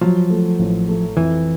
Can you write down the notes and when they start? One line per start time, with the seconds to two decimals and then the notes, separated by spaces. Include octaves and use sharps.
0.01 F3 F#3
0.30 A3
0.59 A1
0.89 A3
1.17 F2 E3